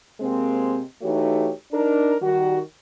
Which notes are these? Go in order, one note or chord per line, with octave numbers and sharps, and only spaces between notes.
C3 G#3 A#3 C4
E3 A3 D#4 F#4 G4 C#5
D4 D#4 A#4
D#3 G3 F#4